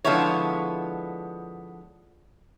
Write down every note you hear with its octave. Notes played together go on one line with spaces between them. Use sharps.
D3 F3 G#3 B3 E4 C#5